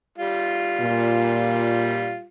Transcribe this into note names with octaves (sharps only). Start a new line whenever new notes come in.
G3 F4
A#2